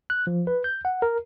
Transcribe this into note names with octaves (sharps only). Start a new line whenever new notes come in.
F#6
F3
B4
G6
F#5
A#4